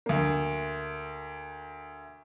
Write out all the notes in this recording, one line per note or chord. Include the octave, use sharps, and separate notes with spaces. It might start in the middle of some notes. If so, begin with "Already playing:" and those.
D2 A#3